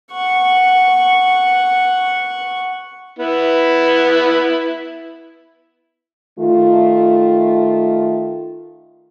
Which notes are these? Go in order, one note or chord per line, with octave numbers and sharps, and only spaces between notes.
F#5 C#6
B3 E4
D#3 A3 F4